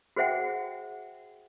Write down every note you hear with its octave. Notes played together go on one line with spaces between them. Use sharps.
F#4 G#4 C5 E5 F#5 G5